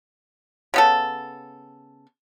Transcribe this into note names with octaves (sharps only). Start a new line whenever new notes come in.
C#3 B3 A4